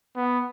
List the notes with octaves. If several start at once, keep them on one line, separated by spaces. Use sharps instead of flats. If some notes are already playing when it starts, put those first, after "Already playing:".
B3